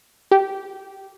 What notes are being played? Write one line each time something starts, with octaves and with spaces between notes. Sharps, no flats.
G4